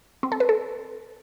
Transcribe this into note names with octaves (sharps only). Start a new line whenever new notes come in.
C4
A4
B4
A4